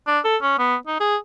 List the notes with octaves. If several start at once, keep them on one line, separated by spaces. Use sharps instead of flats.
D4
A4
C#4
B3
D#4
G#4